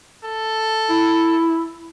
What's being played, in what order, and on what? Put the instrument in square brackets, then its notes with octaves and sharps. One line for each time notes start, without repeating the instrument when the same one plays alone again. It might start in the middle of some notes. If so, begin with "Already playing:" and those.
[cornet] A4
[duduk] E4